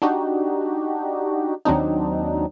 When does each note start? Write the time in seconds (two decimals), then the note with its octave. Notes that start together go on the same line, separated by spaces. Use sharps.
0.02 D4 D#4 F#4 G4
1.65 D#2 F#3 C4 D4 D#4